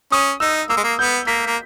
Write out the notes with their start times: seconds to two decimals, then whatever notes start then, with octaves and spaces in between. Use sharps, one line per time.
0.12 C#4 D#6
0.40 D#4 E6
0.69 A#3 E6
0.77 G#3
0.84 A#3
0.99 B3 G6
1.27 A#3 B6
1.47 A#3